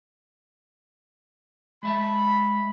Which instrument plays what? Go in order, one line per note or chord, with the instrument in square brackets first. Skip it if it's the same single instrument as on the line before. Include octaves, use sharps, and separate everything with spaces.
[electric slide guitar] G#3 E5 A5 [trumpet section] B5